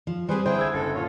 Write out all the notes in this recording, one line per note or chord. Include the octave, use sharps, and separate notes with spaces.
F3
G3 C4 G#4 B4 C5
D3 E4 G#4 C5 G5 G#5
E6 G#6
F#1 A4
A#2 F4 C#5